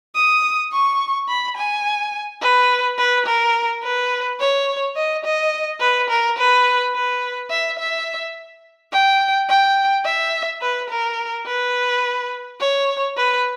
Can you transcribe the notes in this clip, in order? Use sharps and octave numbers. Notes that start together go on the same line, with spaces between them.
D#6
C#6
B5
G#5
B4
B4
A#4
B4
C#5
D#5
D#5
B4
A#4
B4
B4
E5
E5
G5
G5
E5
B4
A#4
B4
C#5
B4